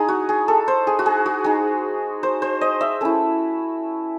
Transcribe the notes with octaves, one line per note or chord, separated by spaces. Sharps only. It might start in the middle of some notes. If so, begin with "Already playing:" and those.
Already playing: G#3 D#4 G#4
F#4
G#4
A4
C5
G#4
F#4
G#4
F#4
G#3 D#4 G#4
C5
C5
D#5
E5
A3 C#4 E4